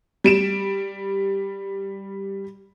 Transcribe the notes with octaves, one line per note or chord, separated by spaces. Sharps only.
G3 D7 E7